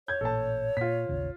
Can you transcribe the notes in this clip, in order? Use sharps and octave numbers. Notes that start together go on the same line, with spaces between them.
C#5 G6 G#6
A1 A#2 A4 A5
A#2 F4 B6
A1 D#2 C#3